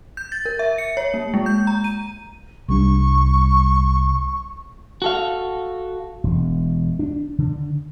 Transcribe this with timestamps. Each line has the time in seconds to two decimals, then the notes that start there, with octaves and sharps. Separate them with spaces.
0.17 G6
0.32 A6
0.46 A#4
0.59 E5
0.78 C#7
0.97 C#5
1.14 A#3
1.34 G#3
1.46 G6
1.67 A#5
1.84 D#7
2.69 C2 G3 D4 C#6
5.02 F#4 A4 F5
6.24 E1
6.99 D4
7.39 D3